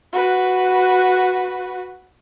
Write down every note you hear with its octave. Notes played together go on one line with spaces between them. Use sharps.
F#4 B4